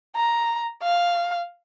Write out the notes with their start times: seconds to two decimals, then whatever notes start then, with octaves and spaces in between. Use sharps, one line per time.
0.16 A#5
0.83 F5